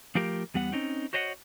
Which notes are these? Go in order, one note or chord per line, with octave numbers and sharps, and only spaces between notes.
F3 A3 F4 G4 A#4
E2 G3 B3 F#5
C4 C#4 D#4
F#4 C5 C#5 D#5 E5 F#5